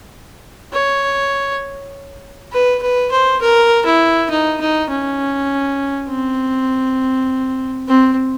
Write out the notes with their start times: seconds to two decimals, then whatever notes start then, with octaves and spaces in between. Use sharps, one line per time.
0.73 C#5
2.52 B4
2.82 B4
3.12 C5
3.42 A#4
3.86 E4
4.30 D#4
4.61 D#4
4.90 C#4
6.09 C4
7.88 C4